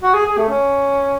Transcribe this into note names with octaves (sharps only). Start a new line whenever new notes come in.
F#4
G#4
G#4
A3
C#4